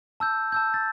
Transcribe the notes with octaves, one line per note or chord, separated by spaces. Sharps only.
A5 E6 G6
A5 E6 G6
A6